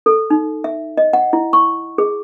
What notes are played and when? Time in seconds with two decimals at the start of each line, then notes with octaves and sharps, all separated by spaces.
0.06 A4
0.30 D#4
0.64 E5
0.97 D#5
1.13 F#5
1.33 E4
1.53 C#6
1.98 G#4